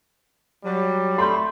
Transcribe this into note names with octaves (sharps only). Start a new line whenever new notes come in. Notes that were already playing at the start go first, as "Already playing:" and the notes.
F#3 G3
A3 B5 C6 G6